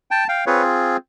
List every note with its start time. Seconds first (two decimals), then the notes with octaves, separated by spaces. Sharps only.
0.11 G5 A5
0.28 F5 G5
0.46 C4 F4 G#4 B4 C#5